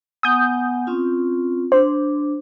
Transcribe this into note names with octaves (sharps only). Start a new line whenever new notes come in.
B3 F#5 G#5 D#6 G6
C4 C#4 F4
D4 C5